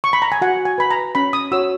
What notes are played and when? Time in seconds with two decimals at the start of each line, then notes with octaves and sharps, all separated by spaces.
0.04 C#6
0.13 B5
0.22 A#5
0.32 G#5
0.41 F#4 F#5
0.65 G#5
0.78 B4 B5
0.91 A#5
1.15 C#4 B5
1.33 D#6
1.52 F#4 C#5 E6